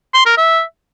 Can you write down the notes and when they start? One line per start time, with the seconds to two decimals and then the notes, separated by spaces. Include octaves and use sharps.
0.14 C6
0.26 A#4
0.37 E5